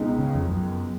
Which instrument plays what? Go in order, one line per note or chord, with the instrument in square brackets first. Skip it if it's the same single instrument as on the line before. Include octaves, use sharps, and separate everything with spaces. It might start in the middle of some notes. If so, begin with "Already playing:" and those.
Already playing: [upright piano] C#2 B2 G#3 D#4
[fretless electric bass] C#3
F2
F#2